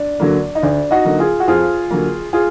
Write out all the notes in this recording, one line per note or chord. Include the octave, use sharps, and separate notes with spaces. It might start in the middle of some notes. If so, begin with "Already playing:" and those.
Already playing: D4
D3 F#3 A#3
D#4
D2 D4
D#4 F#4
D3 F#3 A#3
F4 G#4
F#4
F2 F4 G#4
D3 F#3 A#3
F4 G#4